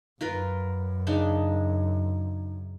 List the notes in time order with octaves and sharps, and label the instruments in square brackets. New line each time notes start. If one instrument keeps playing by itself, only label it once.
[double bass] F#2 [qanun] F4 A#4 B4
[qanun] C#3 D4 D#4